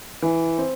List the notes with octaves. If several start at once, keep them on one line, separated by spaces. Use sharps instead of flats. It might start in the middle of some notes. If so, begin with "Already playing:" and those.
E3
C4